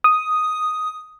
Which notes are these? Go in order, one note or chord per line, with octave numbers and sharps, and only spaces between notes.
D#6